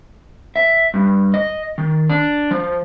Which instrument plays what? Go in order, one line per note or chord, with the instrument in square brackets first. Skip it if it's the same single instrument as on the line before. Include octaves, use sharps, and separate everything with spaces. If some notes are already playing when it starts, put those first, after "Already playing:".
[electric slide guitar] E5
G2
D#5
D#3
D4
F3